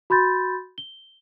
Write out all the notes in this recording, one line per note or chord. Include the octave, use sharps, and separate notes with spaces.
F#4 B5 C6 G6 A6
G7